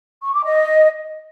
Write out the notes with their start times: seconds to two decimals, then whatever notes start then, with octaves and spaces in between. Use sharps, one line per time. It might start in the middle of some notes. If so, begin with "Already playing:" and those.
0.22 C#6
0.33 D6
0.44 D#5